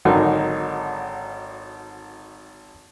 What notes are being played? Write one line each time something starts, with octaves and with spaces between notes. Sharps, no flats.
G#1 D3 F#3 D#4 A#4